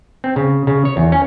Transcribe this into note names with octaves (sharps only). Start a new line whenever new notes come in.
C4
C#3
C#3
C#5
E2
C#4